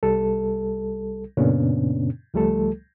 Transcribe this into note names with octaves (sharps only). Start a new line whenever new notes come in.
C2 G3 A4
F#2 A#2 C#3 B3 C#4 D4
C#2 F3 G3 A3 A4